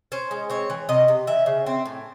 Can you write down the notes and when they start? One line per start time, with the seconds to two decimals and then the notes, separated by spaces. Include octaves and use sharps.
0.12 C#4 C5
0.31 G#3
0.50 C4 C#5
0.70 E3
0.89 C3 D#5
1.08 C3
1.27 E3 E5
1.46 C#3
1.66 C4
1.86 A2